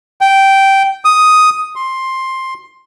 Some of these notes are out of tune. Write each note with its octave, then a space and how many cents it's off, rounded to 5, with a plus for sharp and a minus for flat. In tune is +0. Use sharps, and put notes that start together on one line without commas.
G5 -10
D#6 +5
C6 +10